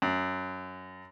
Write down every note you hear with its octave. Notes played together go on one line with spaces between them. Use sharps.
F#2